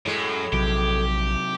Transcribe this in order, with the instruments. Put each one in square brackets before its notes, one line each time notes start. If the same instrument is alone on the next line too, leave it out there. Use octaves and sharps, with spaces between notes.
[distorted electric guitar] F#2 [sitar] A2 G#3
[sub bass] A#1 [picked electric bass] C3 F#3 [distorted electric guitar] G4